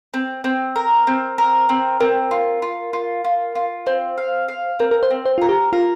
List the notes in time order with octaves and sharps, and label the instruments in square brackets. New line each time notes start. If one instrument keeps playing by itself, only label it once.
[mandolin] C4
C4
A#4
C4
A#4
C4
[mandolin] C4 [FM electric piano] A#4
[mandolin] F4
F4
F4
F4
F4
[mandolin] C4 [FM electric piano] C5
[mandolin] F5
F5
[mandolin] C4 [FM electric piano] A#4
[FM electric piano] A#4
C5
[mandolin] C4
[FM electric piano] C5
[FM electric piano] F4 [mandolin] A#4
[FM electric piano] G4
[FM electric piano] F4 [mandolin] A#4